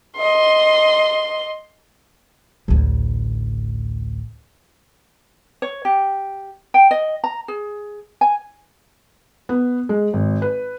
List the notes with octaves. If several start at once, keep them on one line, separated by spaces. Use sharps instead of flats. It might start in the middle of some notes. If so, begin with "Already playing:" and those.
D#5 C6
A1 D2
C#5
G4
G5
D#5
A#5
G#4
G#5
B3
G#3
G#1
B4